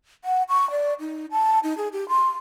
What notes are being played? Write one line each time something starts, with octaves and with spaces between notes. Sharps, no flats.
F#5
C#6
D5
D#4
A5
D#4
G#4
G4
C6